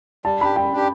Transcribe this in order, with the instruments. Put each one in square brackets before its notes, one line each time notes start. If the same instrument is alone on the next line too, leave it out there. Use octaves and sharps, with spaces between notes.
[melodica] G3 [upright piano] A5
[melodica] D4 G4 [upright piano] B5
[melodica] G3 [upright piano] G5
[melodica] D4 G4